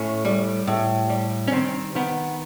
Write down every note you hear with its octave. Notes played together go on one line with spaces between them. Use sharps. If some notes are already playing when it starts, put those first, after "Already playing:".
Already playing: A2 C#4
G3
A2
G3
C#4
D#3 C4
D#3 B3